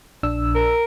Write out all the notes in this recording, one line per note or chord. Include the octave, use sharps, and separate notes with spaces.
A#1 D4 E6
A#4